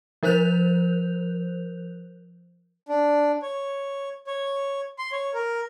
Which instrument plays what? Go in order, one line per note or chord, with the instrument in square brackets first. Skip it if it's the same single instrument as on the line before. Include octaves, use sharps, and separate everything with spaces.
[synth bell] F3 A#4 C5 F#6 G6 F7
[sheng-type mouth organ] D4
C#5
C#5
C6
C#5
A#4